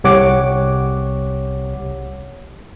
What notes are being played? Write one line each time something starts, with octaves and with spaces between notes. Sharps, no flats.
C2 G4 C#5 F#5 D6